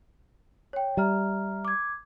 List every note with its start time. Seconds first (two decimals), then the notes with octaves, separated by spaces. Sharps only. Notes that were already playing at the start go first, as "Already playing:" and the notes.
0.73 C#5 G5
0.97 G3 E5 A#5 F6
1.65 D6 G#6